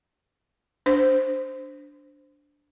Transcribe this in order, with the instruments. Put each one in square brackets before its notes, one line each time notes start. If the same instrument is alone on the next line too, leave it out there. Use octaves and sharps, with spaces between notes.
[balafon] D4 C5